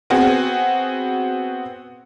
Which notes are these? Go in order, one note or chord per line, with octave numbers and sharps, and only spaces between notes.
B3 C4 F#4 G#4